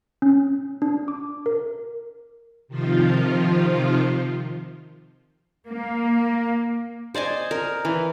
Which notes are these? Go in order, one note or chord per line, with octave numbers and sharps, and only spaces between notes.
C#4
D4
D6
A#4
C3 D#3 F3 F4
A#3
C5 D5 D#5 G#5
A#4
E3